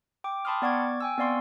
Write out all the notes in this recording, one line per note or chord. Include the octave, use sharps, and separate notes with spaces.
G5 D6
G5 A5 B5 C6 D#6 F6
B3 D5 F#5 C#6 D6 G#6
G5 G#5 E6
B3 C4 D5 F5 C6 C#6